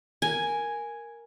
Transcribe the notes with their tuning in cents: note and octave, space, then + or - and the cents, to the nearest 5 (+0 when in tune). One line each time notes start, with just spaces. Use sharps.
A#4 +0 G#5 +0